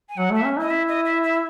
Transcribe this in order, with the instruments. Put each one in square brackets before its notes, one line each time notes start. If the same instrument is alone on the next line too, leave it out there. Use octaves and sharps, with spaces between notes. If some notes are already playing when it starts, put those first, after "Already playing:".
[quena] G#5
[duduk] F#3 [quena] F#5
[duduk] A3 [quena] E5
[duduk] C#4
[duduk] E4 [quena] D#5
[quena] E5
D#5
E5
E5